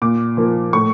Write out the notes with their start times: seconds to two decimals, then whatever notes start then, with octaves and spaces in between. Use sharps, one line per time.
0.02 A#2 D6
0.37 F3 A#3
0.73 A2 C#6